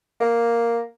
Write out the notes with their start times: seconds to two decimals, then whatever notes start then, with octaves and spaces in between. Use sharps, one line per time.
0.20 A#3